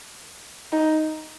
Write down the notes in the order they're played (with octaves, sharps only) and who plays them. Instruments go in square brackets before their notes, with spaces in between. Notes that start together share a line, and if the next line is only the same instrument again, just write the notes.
[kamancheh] D#4